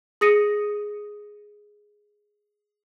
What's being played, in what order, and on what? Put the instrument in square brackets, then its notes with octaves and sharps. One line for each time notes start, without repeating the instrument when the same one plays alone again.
[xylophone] G#4 D#6 A#6 C#7 D#7